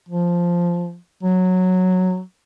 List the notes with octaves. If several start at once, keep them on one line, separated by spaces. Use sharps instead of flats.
F3
F#3